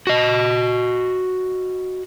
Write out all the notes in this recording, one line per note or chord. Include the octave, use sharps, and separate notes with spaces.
F#4 D#5